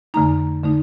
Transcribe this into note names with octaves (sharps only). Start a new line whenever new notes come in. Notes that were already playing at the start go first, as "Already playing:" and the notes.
F2 D3 A3 D#4 A#5
D3 A3 D#4